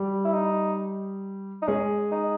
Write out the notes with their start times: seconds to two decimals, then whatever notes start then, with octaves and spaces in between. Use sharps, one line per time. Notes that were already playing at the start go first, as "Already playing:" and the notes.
Already playing: G3 G4
0.25 E4
0.33 D#4
1.62 D#4
1.68 G#3 C#4 G#4
2.12 D#4